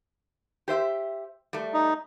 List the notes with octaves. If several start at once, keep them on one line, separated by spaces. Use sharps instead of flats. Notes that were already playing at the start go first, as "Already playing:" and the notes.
G4 C5 E5
G3 A3
D#4